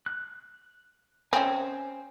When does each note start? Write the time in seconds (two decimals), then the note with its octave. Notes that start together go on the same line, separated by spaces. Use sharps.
0.06 F#6
1.33 C4 C#4 C5 G#5